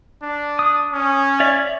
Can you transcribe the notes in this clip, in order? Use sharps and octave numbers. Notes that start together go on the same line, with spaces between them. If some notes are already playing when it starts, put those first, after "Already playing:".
D4
D#6
C#4
C#5 D5 E5